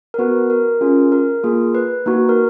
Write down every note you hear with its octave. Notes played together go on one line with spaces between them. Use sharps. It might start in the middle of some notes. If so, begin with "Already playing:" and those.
A#4
B3 F#4 B4
A#4
C#4 F4 G#4
A#4
A#3 F4 G#4
B4
A#3 D#4 F#4
A#4